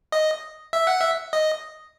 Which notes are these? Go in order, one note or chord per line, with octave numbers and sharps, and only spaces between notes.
D#5
E5
F#5
E5
D#5